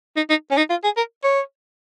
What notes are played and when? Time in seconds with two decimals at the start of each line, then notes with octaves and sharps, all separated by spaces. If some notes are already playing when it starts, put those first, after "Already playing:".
0.16 D#4
0.30 D#4
0.51 C#4
0.57 D#4
0.70 F4
0.84 G#4
0.97 A#4
1.24 C#5